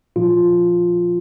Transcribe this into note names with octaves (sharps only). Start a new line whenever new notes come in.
A#2 F3 F4